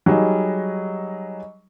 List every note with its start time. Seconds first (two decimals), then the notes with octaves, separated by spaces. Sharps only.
0.06 F#3 G3 D#4 G#4